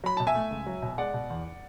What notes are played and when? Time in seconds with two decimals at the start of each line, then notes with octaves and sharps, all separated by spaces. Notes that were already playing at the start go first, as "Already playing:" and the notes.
0.04 F#3 B5
0.17 B2 A5
0.27 E5 G#5
0.35 A3
0.51 C#2
0.66 F#3
0.82 B2
0.98 G#3 D5 F#5
1.14 B2
1.30 E2